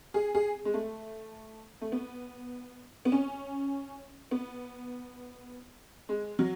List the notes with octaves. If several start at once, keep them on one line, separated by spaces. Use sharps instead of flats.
G#4
G#4
G#3
A3
A3
B3
B3
C#4
B3
G#3
F#3